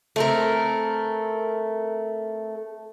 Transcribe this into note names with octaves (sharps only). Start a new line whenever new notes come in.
A3 C4 A#4